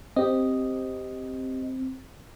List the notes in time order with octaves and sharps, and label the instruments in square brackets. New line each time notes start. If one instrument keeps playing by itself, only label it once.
[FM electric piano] C4 [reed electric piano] G4 D#5